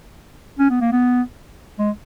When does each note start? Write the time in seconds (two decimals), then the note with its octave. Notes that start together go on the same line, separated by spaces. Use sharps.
0.59 C#4
0.70 B3
0.81 A#3
0.92 B3
1.79 G#3